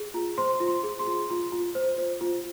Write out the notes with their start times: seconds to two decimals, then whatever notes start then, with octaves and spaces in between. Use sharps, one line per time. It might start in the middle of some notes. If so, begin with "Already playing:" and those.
Already playing: G#4
0.14 F4 A#5
0.38 C5 C6
0.60 F4
0.68 C6
0.83 G#4
0.99 C6
1.06 F4
1.30 F4
1.52 F4
1.75 C5
1.98 C5
2.21 F4